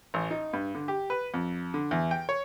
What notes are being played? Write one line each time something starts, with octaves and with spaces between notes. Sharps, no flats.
A1
D#4
G2
D3
G4
B4
F2
D3
E2
G5
C#5